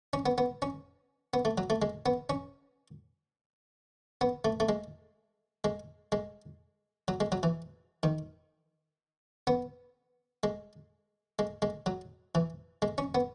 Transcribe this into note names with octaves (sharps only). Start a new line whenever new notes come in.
C#4
B3
B3
C#4
B3
A3
F#3
A3
G#3
B3
C#4
B3
A3
A3
G#3
G#3
G#3
F#3
G#3
F#3
E3
D#3
B3
G#3
G#3
G#3
F#3
E3
G#3
C#4
B3